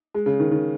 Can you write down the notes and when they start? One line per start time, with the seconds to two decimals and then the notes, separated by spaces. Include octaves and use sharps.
0.14 G#3
0.26 C#3
0.40 D#3
0.52 D#3